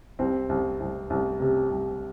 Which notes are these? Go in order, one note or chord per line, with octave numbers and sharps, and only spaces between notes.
C2 C4
C2
C2
C2
C3
C2